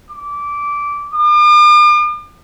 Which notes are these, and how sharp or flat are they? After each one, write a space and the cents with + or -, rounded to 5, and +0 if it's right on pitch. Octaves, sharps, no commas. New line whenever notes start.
D6 -15
D6 +45